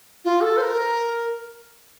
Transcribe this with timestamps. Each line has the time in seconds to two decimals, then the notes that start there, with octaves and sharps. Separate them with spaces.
0.25 F4
0.41 A4
0.57 C5
0.62 A#4